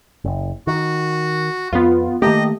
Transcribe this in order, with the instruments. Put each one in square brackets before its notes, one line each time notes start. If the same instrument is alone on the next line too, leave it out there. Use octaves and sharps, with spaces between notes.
[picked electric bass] F#1
[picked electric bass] D#3 [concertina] F#4
[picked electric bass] F2 [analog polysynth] B3 F4
[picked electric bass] D#3 A3 A#3 [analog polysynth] G4 [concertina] D#5